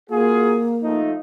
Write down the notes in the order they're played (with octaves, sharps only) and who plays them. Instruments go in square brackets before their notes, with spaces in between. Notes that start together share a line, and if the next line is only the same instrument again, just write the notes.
[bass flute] A#3 [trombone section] F4 F#4 G#4
[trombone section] F3 A3 D#4